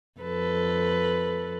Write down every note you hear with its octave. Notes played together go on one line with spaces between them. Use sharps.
F2 A4 B4